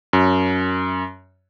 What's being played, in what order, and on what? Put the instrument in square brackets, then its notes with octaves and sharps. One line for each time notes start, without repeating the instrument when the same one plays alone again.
[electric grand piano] F#2